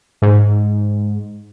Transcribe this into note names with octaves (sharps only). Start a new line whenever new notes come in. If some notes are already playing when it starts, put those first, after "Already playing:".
G#2